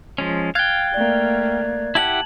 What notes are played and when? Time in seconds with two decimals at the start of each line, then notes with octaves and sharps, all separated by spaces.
0.18 F3 G#3 C#4
0.55 F5 G5 F#6 G#6 A6
0.94 A3 A#3 D5
1.95 E4 G4 F#5 A5 F#7